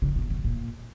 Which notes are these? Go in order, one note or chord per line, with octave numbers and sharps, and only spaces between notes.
C#3
B2
B2
A#2